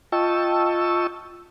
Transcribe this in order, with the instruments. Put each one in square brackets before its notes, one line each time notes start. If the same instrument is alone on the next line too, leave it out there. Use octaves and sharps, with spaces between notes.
[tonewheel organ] F4 D#5 G5 A5 C#6 E6